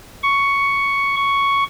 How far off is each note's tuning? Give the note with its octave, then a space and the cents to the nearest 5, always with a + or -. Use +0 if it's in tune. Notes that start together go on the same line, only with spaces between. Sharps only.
C#6 +5
C#6 +5